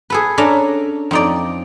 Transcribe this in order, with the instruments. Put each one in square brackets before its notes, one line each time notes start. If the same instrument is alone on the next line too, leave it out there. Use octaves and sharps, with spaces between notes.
[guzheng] G#4 A4 B4
C#4 D4 A4 E5 A#5
F2 D#4 D5